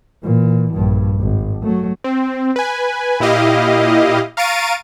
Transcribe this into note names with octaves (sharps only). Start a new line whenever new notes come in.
A#2 E3
A#1 G2
G#1
F#3 A3
C4
B4 G#5
A#2 E4 G4 D#5 F5
F5 A#5 C#6 A6 D7 D#7